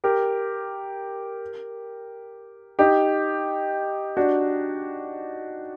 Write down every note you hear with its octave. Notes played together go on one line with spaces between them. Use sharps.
G4 A#4
D#4 G4
D4 F#4